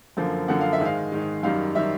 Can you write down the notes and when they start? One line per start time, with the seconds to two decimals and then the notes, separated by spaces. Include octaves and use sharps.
0.17 F#2 D3 F3 A#3
0.48 F#2 D3 F3 A#3 F#5
0.61 F5
0.73 E5
0.80 G#2 D#3 G#3
0.85 F5
1.12 G#2 D#3 G#3
1.43 F#2 D#3 G3 F5
1.75 D#3 G3 E5